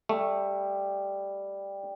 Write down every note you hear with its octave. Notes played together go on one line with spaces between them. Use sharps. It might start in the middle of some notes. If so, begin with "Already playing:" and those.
G3 A3